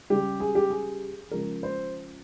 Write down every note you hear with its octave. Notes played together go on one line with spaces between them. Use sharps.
C#3 G3 G4
G#4
G4
G#4
C#3 F3 G#3 A#4
C5